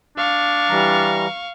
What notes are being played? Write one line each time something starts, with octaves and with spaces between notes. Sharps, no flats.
D4 F5 C#6
E3 G3 A#5